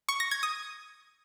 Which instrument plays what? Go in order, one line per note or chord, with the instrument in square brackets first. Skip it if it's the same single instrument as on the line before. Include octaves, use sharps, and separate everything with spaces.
[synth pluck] C#6
A#6
G#6
D#6